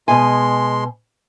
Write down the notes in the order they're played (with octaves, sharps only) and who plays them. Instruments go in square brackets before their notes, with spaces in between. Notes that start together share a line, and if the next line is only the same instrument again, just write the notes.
[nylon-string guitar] B2 G#5 [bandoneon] G#3 C6